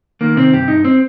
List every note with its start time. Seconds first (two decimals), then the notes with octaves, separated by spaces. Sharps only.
0.21 D#3 A#3
0.36 C3 C4
0.53 G2 G4
0.68 G2 D#4
0.84 C4